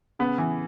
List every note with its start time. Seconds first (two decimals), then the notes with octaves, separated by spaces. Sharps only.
0.19 C#3 B3
0.38 E3